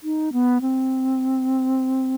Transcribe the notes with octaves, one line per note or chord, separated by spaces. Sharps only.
D#4
B3
C4